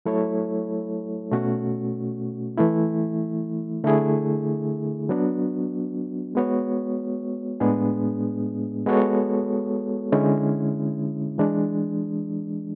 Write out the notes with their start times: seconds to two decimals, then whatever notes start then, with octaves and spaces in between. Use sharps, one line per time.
0.06 F#3 A3 E4 A4 C#5
1.32 B2 A3 C#4 F#4
2.58 E3 A3 E4
3.84 D3 A3 E4 G#4
5.09 F#3 B3 D4 F#4
6.35 G#3 B3 F#4 C#5
7.60 A2 G#3 B3 D4 G#4
8.86 G#3 B3 F#4 A4 C#5
10.12 D3 G#3 C#4 E4
11.38 E3 G#3 D4